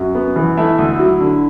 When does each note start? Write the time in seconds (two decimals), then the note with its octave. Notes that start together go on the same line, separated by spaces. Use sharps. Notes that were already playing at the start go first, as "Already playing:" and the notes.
Already playing: F#2 F#4
0.15 B3
0.36 E3
0.57 A3 E4 E5
0.78 D2
0.99 F#3
1.20 D3